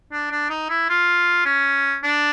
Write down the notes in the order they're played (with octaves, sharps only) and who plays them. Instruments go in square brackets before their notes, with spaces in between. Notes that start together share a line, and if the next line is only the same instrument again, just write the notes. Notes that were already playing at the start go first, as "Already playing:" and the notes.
[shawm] D4
D4
D#4
E4
F4
C#4
D4